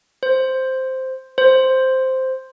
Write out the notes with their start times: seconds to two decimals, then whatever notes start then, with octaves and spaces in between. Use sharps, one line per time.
0.23 C5
1.38 C5